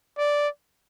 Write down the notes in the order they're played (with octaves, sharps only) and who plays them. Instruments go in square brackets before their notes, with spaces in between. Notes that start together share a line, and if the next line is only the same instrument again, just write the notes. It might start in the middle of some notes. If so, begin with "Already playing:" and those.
[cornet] D5